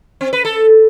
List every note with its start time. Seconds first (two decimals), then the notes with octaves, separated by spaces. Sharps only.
0.21 C4
0.33 B4
0.45 A4